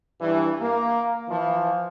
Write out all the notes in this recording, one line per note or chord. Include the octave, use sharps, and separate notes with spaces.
G2 E3
A#3
E3 F3